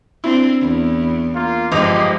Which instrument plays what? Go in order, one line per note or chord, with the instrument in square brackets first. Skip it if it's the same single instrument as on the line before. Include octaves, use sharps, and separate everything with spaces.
[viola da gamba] C4 D4 [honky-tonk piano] E4
[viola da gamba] E2
[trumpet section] A#3 F4
[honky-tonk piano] G1 D6 F7 [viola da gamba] G#2 F3 [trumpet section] G4 D#5